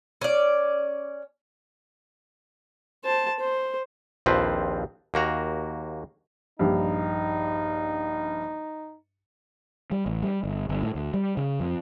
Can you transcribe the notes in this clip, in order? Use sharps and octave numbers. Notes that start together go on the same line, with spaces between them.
C#4 D5
C5 A5
C5
A#1 D#2 F3 C4 B4
D#2 A#3 F#4 A#5
A#1 G2 D#4
G3
A1
G3
G1
G1
A2
D2
G3
C#3
F2